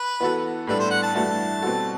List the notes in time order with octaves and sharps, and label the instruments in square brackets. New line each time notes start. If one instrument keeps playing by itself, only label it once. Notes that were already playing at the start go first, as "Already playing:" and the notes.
Already playing: [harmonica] B4
[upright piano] E3 B3 F#4 A4
[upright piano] A2 G3 B3 D4 A4 [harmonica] B4
[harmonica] C5
F#5
A5
[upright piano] G2 E3 A3 D4 F#4 [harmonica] A5
[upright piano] B2 G3 C4 F#4 A4